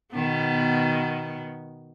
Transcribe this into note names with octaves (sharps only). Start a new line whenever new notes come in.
B2 D#3 B3